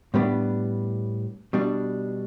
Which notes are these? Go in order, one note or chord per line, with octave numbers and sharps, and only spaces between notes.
A2 G3 B3 D4
B2 G3 D4